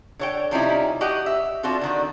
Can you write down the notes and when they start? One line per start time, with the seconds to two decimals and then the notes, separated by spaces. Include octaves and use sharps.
0.19 D3 C#5 G5
0.51 C3 F3 G3 C#4 D#4 E4
1.01 F#4 G4 D#5 F#5
1.26 E5
1.63 C4 D4 F4 F#4 A4
1.81 D3 D#3 F#4